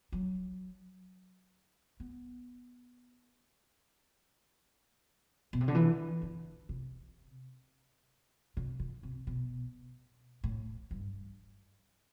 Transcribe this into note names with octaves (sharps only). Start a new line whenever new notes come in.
F#3
B3
B2
C3
D3
E3
D3
C3
C3
D3
C3
B2
A2
G2